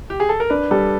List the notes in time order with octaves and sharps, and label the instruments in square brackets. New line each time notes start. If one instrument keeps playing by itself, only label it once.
[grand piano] G4
G#4
A4
A#4
[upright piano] D4 [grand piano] B4
[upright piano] G3 [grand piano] A4